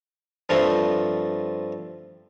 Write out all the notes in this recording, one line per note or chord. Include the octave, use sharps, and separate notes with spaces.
G2 F3 A3 C4